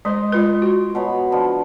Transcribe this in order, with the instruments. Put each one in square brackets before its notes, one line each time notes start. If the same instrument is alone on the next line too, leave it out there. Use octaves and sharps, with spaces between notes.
[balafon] G#3 C5 [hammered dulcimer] D#5 C6
[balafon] G#3 F4 B4
F#4
[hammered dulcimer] B2 C#5 B5
D3 F3